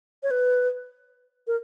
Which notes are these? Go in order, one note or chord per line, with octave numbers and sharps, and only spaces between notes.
C#5
B4
A#4